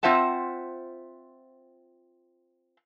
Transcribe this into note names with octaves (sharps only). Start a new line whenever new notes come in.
C4 F4 C5 E5 F#5 A5